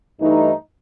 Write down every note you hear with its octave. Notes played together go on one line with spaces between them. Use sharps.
G2 E3 A3 D#4